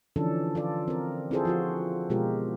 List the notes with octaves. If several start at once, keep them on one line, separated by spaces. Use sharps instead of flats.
D3 E3 F3 C#4 D4 A4
F4 A4 D5
C4 A#4
C4 E4 F4 G#4 A4 C5
F3 F4 F#4
B2 G#3 F4 G4 A#4